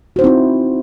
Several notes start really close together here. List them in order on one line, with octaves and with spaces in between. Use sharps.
F#4 C5 D#4 C4 E4